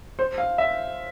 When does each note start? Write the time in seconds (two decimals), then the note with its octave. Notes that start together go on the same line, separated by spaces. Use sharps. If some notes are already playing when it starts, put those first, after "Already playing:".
0.19 C5
0.38 F5
0.58 E5